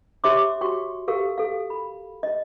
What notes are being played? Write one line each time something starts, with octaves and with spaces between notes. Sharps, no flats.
G4 C#5 E5 C6 D6
F#4 G5 C6 C#6
G4 A4 A#4 F5
A4 F5
B5
D#5